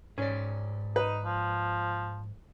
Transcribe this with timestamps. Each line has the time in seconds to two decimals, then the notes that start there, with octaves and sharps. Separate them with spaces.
0.18 G#2 C#4 D5
0.96 D#4 B4
1.25 F3